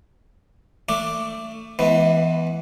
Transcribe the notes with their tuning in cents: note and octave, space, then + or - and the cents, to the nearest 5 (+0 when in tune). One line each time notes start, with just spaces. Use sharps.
A3 +25 D4 +0 D6 +5
E3 +5 G#3 +35 B3 +0